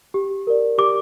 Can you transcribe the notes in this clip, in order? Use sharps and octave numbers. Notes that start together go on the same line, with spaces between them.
G4
A#4 D5
G4 D6